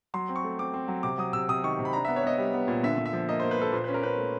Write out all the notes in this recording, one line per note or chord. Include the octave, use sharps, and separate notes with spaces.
F#3 C6
C4
C#6
A3
C4 D6
C4
F#3
C3 D6
F#3 D#6
C3 E6
C3 D#6
D#3 C#6
C3
B5
D4 A#5
B3 E5
C#5
B3 D#5
G3
B3
A#2
D3 E5
D3
E5
F3
A#3 D#5
A#3 C5
B4
A#3 A4
A#2 C5
C#4 B4
A#4
C#4 B4
A3